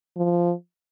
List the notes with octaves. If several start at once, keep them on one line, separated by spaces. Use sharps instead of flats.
F3